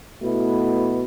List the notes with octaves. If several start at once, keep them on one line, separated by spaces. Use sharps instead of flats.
B2 A3 E4 B4